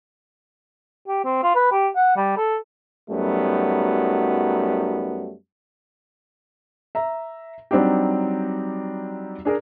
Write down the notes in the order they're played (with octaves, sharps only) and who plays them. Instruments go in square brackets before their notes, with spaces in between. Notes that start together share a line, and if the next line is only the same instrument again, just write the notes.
[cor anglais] G4
C4
F4
B4
G4
F#5
G3
A4
[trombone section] F#2 F#3 G3 A3 B3 D#4
[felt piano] E5 A#5
F#3 G3 C4 D4 D#4 G4
D4 G#4 A#4